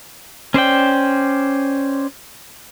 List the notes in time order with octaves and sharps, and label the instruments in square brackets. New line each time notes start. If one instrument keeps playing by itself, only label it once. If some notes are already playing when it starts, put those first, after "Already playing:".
[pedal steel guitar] C#4 C5 D5 G5